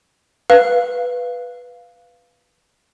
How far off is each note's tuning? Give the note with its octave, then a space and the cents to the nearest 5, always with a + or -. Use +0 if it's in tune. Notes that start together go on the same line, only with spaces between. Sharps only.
B4 +0 F5 +0